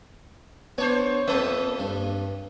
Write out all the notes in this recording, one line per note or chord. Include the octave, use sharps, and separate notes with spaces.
B3 D4 C5 C#5
F2 A#3 A4 E5
G2